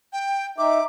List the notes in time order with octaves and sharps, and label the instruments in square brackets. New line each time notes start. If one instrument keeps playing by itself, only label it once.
[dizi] G5
[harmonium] D#4 E5 [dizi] D6